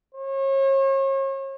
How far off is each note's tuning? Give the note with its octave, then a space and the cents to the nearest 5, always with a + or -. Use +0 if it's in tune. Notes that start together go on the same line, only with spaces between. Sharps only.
C#5 -40